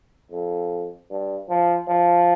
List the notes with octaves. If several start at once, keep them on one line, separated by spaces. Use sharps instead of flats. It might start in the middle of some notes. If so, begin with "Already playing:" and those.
F2
G2
F3
F3